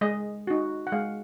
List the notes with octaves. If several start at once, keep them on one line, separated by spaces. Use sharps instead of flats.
G#3 D#5
D#4 F#4
F#5
G#3 F5